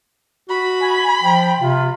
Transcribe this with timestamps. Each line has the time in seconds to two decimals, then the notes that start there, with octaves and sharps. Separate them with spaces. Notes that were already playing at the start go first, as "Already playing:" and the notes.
0.49 F#4 B5
0.80 G#5
1.22 F3 G5
1.60 C3 F4